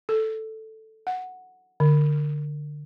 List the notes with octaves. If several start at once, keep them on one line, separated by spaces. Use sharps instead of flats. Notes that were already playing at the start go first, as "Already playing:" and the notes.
A4
F#5
D3